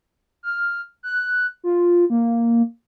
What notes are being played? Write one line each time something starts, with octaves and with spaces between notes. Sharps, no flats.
F6
F#6
F4
A#3